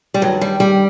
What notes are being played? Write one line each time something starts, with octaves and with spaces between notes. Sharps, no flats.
G3
G2 D#3 F#3
G3
G3